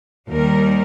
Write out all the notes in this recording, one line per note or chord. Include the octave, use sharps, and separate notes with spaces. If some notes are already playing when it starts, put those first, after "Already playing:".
D#2 D#3 G3 A#4